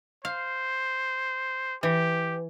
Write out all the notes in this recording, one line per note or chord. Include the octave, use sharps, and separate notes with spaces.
C5 F5
E3 G4